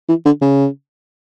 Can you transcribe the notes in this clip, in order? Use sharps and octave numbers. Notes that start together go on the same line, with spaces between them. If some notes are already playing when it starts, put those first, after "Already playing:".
E3
D3
C#3